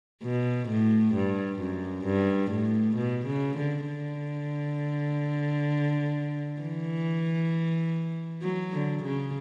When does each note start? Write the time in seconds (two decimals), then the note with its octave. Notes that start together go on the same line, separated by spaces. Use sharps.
0.23 B2
0.69 A2
1.15 G2
1.60 F#2
2.06 G2
2.51 A2
2.96 B2
3.27 C#3
3.57 D3
3.87 D3
6.61 E3
8.42 F#3
8.73 D3
9.04 C#3